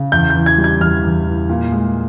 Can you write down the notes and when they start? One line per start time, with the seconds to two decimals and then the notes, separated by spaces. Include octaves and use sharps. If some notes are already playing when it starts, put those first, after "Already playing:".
Already playing: C#3
0.12 E2 G6
0.30 G6
0.35 E3
0.46 G#6
0.58 G3
0.64 G#6
0.81 E2 F6
1.03 E2
1.27 E3
1.49 A#2
1.72 G#3